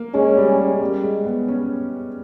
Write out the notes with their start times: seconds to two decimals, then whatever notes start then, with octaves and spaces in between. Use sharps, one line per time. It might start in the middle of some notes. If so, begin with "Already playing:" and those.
Already playing: A#3
0.14 G#3 C#4
0.37 G3
0.58 G#3
0.81 G3
1.03 G#3
1.25 B3
1.48 C#4